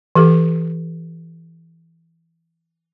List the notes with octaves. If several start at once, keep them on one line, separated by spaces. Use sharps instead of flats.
E3 G4 A4